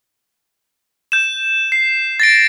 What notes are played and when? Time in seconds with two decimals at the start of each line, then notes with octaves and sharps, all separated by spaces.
1.12 G6 E7
1.72 C7
2.20 A6 A#6 D7